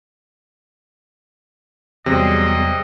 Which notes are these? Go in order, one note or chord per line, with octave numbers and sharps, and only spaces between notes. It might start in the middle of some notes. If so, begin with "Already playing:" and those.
E2 C3 F#3 G3 C4 G#4 D#5